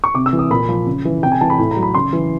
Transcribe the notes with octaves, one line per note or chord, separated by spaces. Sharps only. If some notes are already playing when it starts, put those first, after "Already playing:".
C#6
C3 D6
E6
E3
D#6
A#2 B5
F3
C#3
E3
C3 G5
G#5
E3 A5
B5
A2
A#5
F#3
B5
C#3 C6
E3